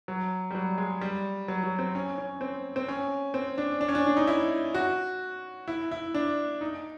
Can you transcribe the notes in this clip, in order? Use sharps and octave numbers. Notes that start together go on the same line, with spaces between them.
F#3
G3
F#3
G#3
G3
F#3
F#3
C4
C#4
C#4
C4
C4
C#4
C4
D4
D4
C#4
D4
D4
D#4
E4
F#4
E4
E4
D4
D#4